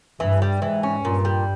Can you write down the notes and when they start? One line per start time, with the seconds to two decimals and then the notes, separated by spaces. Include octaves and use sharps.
0.20 G2 E3
0.42 G3
0.62 G#2 E3
0.83 C#4
1.05 G2 A#2
1.25 G3